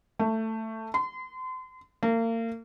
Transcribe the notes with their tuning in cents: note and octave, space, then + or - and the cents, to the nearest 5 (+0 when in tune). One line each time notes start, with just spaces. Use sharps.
A3 +15
C6 -35
A#3 -35